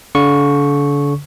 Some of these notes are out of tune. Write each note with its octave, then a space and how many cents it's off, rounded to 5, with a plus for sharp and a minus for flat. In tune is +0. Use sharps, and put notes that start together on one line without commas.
D3 -40 C#6 -5